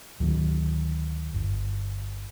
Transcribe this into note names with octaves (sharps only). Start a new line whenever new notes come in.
D2 D#3 F#3
G1